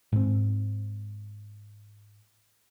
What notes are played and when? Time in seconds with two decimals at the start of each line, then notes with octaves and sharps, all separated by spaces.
0.12 G#2 C4